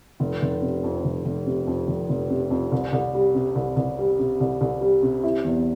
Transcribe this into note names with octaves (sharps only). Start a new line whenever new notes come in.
F1
F1
C3
F2
F1
F1
C3
F2
F1
F1
C3
F2
C2
C2
G3
C3
C2
C2
G3
C3
C2
C2
G3
C3
E4
E2